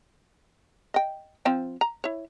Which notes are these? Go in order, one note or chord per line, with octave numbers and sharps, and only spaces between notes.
D#5 G5
F3 C4 G5
A#5
E4 C#5